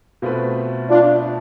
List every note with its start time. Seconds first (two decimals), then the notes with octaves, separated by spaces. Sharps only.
0.22 B2 A3 C4 F4 B4
0.89 D4 F4